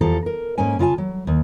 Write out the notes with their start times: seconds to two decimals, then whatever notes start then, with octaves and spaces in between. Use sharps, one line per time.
0.01 E2 F3 G4 A4 F5 A#5
0.26 A#4
0.58 G#2 A#3 C#4 G#5
0.79 C#3 F4 E5 G#5 A5
0.98 F#3
1.27 D#2